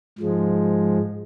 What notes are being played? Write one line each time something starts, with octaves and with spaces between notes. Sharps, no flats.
G#2 F3 G#3